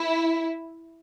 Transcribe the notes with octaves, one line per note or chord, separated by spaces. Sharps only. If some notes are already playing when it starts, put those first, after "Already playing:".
Already playing: E4